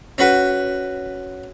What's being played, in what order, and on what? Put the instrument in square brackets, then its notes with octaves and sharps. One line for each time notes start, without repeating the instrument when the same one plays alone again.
[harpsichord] C#4 F#4 B4